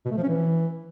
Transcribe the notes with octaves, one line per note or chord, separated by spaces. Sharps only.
B2
A3
F3
C#4
E3